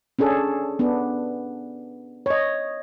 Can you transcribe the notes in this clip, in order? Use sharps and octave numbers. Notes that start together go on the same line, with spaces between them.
C#4 D4 G#4 A4
B3 D4
C#5 D#5